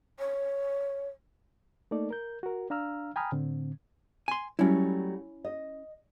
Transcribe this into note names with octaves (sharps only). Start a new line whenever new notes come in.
C#5
A3 A#3 D#4 A4 D5
A#4 G6
F#4 A#4
D4 F5 A#5 E6 F6
G5 G#5 A#5 B5 D#6 F6
A2 D3 C4
G#5 C6
F#3 G3 A3 C#4 E4
D#5